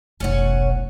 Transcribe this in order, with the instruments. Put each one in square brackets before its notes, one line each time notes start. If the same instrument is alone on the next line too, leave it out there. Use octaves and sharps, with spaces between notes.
[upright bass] F1 B1 [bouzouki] C#4 C#5 F#5